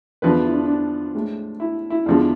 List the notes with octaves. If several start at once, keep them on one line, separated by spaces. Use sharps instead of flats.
E2 D3 F3 B4
E4
D4
D4
A2 G#3
E4
E4
E2 D3 F3 G#3